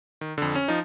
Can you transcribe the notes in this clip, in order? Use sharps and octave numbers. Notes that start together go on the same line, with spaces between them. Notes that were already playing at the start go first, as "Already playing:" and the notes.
D#3
F2 D3
C#4
F3 D#4